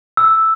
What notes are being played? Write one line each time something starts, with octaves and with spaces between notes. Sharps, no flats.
E6